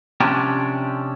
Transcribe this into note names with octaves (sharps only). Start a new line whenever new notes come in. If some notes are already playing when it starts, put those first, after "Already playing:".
C3 F3 C#4 D4 G4